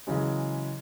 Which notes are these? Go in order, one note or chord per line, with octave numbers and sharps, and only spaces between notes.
C#3 E3 F#3 G#3